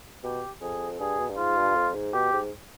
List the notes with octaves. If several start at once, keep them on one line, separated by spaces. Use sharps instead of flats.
B2 G4
F2 G#4
G2 G#4
B2
G2
G#2 F4
G2
F2
G#2
B2 G4
G#2